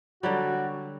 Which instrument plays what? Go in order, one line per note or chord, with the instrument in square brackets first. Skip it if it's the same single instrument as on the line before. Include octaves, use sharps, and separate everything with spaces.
[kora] D3 F#3 G3 [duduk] F#4